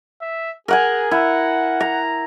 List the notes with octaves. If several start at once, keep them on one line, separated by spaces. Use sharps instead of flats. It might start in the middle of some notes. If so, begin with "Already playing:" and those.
E5
G#4 A#4 F#5 G#5
E4 F#5
A#5